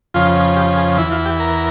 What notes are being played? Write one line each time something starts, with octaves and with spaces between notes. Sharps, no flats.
F2 C#3 F3 F4
G4
G#4
E2 E3 E4
F4
G4
A#4